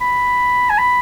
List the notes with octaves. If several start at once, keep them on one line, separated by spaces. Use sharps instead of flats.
B5
G#5
B5